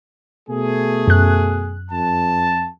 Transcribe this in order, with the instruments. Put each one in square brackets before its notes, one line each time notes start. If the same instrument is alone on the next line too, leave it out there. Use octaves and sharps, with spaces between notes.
[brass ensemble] B2 A3 G#4
[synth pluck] F#2 F#6
[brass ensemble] F2 A5